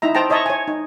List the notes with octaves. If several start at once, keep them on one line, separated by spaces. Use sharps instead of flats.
D#4 E4 E5 A#5
C5 G5 A5 A#5
C#5 D#5 E5 A5 A#5 C#6
C#5 G#5
D#4